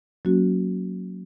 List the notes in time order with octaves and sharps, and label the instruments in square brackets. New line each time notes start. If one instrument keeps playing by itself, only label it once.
[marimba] F#3 A#3 C#4 F#4